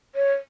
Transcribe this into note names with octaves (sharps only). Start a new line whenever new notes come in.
C#5